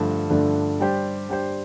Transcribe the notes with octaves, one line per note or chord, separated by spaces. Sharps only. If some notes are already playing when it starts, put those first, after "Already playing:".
Already playing: G2 D3 F3 A3 D4
G2 D3 F3 A3 D4
G3 D4 G4 C5
G3 D4 G4 C5